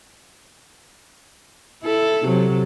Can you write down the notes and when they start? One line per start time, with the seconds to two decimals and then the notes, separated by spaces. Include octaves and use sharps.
1.83 E4 A4
2.26 C3 F#3